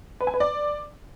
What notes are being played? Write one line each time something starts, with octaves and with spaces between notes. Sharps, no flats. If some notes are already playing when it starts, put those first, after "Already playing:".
B4
G#5
B4
D5